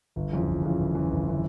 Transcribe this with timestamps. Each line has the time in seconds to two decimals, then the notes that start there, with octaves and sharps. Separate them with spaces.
0.16 G1
0.32 F2 C#3 E3
0.47 G1
0.63 F2 C#3 E3
0.79 G1
0.95 F2 C#3 E3
1.10 G1
1.27 C#3 E3